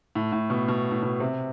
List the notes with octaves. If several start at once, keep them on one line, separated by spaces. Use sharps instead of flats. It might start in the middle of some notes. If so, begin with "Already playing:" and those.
A2
A2
B2
B2
A2
B2
C3